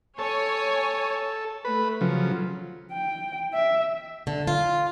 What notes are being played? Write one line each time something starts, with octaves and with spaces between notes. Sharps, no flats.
A4 C#5 G#5
A3 B4
C#3 F3 F#3
G5
E5
D3
F4